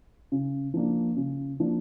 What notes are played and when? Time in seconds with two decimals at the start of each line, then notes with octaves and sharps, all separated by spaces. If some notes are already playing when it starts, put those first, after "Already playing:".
0.32 C#3
0.74 F3 A#3 D4
1.16 C#3
1.60 F3 A#3 D4